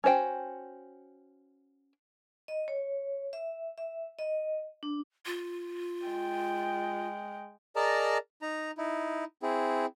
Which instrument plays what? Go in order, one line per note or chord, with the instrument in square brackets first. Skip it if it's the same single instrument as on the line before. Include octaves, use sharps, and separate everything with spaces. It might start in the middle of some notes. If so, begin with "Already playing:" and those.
[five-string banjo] C#4 F#4 C5 G5
[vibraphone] D#5
C#5
E5
E5
D#5
D4
[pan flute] F4
[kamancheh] G#3 G5
[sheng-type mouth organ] G#4 A#4 D5 D#5 A5 A#5
D#4 A#5
D#4 E4
C4 E4 G#4